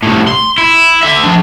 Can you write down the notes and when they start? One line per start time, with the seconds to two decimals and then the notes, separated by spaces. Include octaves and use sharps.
0.02 C2 A2
0.28 C6
0.58 E4
1.03 D3 E5
1.24 F3 D4